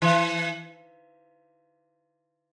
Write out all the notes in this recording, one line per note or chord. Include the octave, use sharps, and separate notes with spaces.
E3